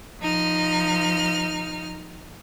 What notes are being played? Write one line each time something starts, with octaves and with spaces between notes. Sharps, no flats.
F3 D#4 F6